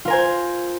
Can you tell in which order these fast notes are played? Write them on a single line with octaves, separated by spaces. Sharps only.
F4 A#4 G#5 C5